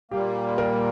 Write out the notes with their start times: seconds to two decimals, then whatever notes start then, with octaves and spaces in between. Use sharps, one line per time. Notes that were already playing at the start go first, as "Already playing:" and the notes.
0.11 A#2 G3 A#3 G4
0.58 A#4